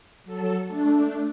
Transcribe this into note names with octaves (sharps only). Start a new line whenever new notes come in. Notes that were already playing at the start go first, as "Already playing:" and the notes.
F#3 A4
A3 D4